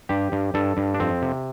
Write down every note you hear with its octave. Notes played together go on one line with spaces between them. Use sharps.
G2 G4
G2
G2 A4
G2
D4
F2 C4
C3